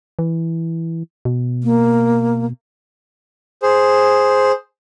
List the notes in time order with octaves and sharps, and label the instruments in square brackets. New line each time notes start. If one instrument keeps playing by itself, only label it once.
[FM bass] E3
B2
[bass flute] A#3
[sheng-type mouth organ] G#4 C5